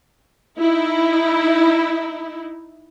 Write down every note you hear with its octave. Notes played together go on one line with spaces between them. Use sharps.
D#4 E4